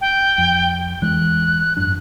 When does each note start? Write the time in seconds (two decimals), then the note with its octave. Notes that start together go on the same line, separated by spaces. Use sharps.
0.01 G5
0.38 F2
1.02 E2 E3 G#3 F#6
1.77 G#1 F#2 D4 F#6